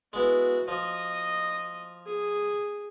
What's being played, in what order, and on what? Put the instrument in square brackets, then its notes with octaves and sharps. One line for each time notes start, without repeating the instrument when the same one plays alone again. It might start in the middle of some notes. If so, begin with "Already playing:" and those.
[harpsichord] G#3 B3 E4 [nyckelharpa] F#4
[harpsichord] F3 [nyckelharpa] D#5
[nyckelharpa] G#4